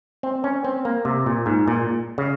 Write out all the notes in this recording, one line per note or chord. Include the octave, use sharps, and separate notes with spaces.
C4
C#4
C4
A#3
C3
A#2
G#2
A#2
C#3